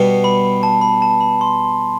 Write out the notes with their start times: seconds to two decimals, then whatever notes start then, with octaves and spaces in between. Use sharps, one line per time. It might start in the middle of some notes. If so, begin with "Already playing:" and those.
Already playing: B2 G3 B3
0.24 B5
0.63 A5
0.81 B5
1.02 A5
1.21 B5
1.41 C6